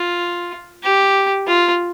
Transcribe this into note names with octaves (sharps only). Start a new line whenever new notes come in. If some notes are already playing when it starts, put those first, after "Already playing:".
Already playing: F4
G4
F4